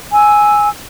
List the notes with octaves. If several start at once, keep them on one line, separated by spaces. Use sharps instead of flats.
G#5 E6